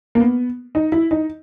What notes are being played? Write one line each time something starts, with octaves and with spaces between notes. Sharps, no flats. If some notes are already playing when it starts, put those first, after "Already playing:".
A#3
B3
D#4
E4
D#4